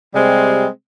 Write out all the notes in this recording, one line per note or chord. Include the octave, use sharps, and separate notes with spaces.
C3 G3 G#3 C4